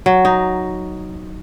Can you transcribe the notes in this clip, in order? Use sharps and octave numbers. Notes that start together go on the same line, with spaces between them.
F#3
D#4